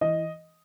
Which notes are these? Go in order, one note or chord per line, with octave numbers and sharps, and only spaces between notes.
E3 D#5